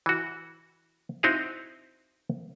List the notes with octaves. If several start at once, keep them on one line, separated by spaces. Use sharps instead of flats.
E3 F#4
C4 D#4 E4 F#4 D#5 F5